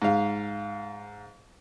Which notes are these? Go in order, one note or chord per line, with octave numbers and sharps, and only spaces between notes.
G#2 F5